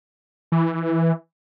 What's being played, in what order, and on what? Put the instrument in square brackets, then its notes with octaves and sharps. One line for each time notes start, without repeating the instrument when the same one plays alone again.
[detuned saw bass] E3